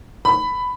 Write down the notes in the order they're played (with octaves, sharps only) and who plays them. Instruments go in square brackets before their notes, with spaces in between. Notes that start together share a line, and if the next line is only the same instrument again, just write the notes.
[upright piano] B5